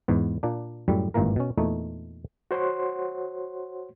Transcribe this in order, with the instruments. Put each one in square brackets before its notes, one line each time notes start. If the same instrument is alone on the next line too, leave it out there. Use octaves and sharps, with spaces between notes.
[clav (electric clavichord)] E2 G#2 B3
A#2 A#3 D4
F#2 A2 G3
G#1 G2 A#2 E3 A#3 A#4
B2 C#4
E2 A#2 A3 D#4
[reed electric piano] F#4 C5 C#5 F#5 C6